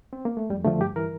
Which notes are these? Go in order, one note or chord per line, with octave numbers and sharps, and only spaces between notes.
C4
A#3
A3
F2 G3
D3 F3 A3
G2 G4
E3 A#4